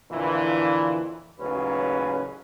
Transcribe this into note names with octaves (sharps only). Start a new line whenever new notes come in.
F2 A#2 D3 E3
A1 D#2 C#3 F#3 C#4 B4